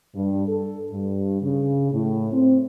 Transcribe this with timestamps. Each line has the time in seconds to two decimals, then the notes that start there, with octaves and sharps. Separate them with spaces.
0.14 G2
0.48 A4
0.92 G2
1.42 C#3
1.92 A2
2.32 C4